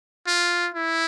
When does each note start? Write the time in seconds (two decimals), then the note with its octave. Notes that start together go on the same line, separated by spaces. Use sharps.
0.27 F4
0.75 E4